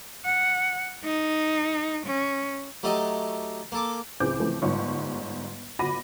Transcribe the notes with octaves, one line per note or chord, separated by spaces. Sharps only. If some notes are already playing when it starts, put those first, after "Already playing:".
F#5
D#4
C#4
F#3 A3 D#4 G4 A4 D#5
A#3 A4 D6
C#2 A2 C4 G#4 D6 G6
C#3 E3 F3 A3 C4
G1 G#2 G3 C#5 C#6
G1 F#4 B5 D6 A#6 D#7